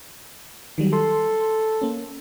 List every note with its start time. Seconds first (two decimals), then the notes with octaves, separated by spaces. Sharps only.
0.78 D#3 F#3 G3
0.93 A4 C6
1.81 A#3 C#4